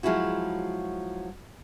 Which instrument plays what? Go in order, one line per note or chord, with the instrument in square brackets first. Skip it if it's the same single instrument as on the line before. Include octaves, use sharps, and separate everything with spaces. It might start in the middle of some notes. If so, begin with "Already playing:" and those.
[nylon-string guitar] F3 F#3 G#3 E4 F#4